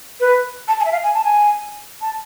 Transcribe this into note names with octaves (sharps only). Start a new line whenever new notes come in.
B4
A5
G#5
E5
F5
G#5
A5
G#5
A5